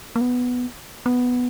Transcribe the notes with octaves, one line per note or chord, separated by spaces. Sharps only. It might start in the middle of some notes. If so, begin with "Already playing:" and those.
A#3
B3
B3